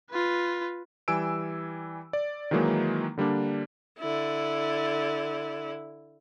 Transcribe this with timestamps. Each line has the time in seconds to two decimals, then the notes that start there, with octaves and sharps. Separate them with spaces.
0.11 F4 B4
1.08 E3 G3 G#5 E6 D7
2.13 D5
2.51 D#3 E3 F#3 G#3 A#3 D#4
3.17 D3 G3 A#3 D4
3.99 D3 E4